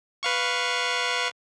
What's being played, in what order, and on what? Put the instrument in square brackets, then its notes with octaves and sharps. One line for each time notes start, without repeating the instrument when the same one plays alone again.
[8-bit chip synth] B4 F5 C#6